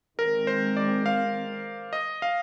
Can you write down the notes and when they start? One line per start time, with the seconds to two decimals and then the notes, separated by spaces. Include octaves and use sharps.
0.19 D#3 G#3 C4 A#4
0.47 C5
0.77 D5
1.06 F5
1.93 D#5
2.22 F5